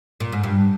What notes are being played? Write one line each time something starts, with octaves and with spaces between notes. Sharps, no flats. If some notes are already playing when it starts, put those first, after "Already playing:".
A#2
G#2
G2